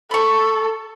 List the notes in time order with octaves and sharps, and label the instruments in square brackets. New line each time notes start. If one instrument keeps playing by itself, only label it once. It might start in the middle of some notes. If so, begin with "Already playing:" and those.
[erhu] A4 [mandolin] B5 C#6